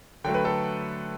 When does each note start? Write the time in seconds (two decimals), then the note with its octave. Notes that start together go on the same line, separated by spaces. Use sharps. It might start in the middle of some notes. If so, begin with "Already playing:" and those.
0.24 D3 F#3 A3 G5
0.34 B4
0.45 A4